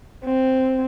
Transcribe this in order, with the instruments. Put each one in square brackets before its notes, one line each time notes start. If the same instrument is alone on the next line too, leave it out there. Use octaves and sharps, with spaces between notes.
[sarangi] C4